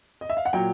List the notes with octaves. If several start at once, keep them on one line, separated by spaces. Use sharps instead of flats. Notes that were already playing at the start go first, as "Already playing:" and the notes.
D#5
E5
F5
F#5
A#2 F#3 G5